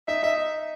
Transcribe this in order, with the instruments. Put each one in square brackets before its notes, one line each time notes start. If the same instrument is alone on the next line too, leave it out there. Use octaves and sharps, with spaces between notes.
[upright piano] D#4 [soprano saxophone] E5
[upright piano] D#4 [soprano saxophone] E5